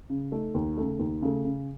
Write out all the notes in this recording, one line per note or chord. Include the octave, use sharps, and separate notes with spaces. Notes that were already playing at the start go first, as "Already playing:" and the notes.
C#3
A3 D#4 A4
D#2
C#3 A3
D#2
C#3 A3
C#3